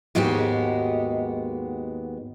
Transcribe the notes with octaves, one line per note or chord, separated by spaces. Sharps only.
D#2 G#2 G#3 B3 F#4 G4